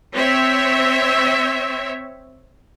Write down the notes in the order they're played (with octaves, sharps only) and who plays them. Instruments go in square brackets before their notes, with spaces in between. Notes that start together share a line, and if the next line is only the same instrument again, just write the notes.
[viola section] C4 C#5 E5